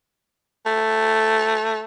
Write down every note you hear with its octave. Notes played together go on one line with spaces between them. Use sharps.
A3